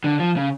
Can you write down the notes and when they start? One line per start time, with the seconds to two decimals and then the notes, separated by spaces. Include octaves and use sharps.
0.04 D3
0.19 F3
0.37 C#3